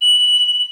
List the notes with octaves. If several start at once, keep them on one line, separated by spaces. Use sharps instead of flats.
F#7